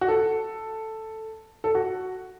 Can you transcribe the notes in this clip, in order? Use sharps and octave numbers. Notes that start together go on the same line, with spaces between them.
F#4
A4
A4
F#4